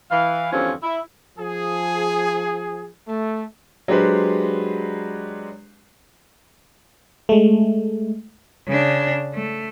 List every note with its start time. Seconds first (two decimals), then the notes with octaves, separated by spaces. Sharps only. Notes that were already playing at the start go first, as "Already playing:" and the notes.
0.11 E3 F5
0.52 E2 G2 D3 F3 C4 C#4
0.83 E4
1.38 F3 G#4
3.08 A3
3.88 F#3 G#3 D4 G4 B4 C5
7.29 G#3 A3
8.68 C#3 D4
9.34 A3